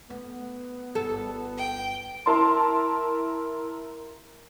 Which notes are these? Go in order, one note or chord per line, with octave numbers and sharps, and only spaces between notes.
A3 B3
G1 A4
G5
E4 A#4 A5 C6